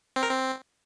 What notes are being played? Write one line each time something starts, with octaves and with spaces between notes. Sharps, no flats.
C4
A#4
C4